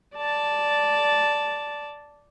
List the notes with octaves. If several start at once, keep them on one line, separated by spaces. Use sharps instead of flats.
D5 A5